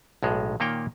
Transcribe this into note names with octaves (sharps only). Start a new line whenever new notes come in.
B1 A2 G#3
A#2 D#3 A#3 C#5 G5